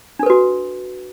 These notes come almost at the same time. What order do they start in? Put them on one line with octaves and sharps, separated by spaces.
D4 A4 B4 F#4